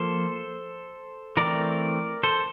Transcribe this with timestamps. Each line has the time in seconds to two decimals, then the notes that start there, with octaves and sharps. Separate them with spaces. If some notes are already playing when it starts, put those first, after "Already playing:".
Already playing: F3 A#3 A4 C5
1.37 E3 A3 C4 A#4 D5
2.23 A4 C5